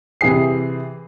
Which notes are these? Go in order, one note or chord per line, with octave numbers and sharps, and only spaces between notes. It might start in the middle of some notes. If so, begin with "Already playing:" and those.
C3 E3 G#4 C7